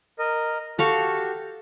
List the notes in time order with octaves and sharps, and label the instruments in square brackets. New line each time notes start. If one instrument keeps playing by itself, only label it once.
[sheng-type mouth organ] A#4 D#5
[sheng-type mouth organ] F#4 G4 [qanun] A4 F5 C#6